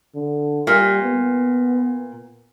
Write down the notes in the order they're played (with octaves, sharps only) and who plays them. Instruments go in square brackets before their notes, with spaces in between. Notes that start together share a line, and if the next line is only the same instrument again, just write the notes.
[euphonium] D3
[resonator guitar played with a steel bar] A#2 [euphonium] G3
[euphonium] B3